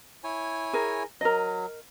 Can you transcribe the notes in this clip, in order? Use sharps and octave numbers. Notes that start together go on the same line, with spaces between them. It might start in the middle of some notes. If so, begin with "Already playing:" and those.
E4 C#5 G#5
G#4 A#4
F#3 A#4 D#5